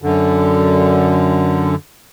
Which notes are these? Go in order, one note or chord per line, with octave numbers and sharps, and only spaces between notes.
F#2 D3